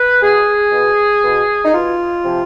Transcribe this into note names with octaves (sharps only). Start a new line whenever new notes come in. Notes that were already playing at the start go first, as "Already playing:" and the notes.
Already playing: B4
B2 G#4
B2
B2
D#4
B2 F4
C3 F3